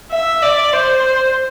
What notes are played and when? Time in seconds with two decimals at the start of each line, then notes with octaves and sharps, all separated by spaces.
0.11 E5
0.42 D5
0.73 C5